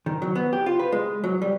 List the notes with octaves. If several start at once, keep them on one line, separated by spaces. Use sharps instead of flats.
D#3
F#3
B3
G4
F4
B4
G#3
F#3
G3